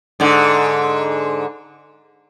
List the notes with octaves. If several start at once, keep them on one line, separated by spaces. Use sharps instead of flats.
G#2 D3